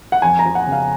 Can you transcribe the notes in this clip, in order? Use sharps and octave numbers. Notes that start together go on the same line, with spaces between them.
F#5
F2 G#5
A#5
F3
F#5
C#3
F5